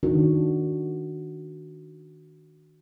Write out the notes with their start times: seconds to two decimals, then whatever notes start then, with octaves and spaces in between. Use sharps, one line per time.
0.03 D#3 D4 F#4